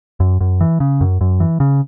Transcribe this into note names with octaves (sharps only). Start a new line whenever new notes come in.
F#2
F#2
E3
C#3
F#2
F#2
E3
C#3